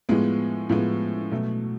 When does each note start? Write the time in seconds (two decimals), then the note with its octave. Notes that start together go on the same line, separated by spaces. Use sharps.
0.09 A2 F3 G#3 B3
0.69 A2 F3 G#3 B3
1.31 B2 F#3 A3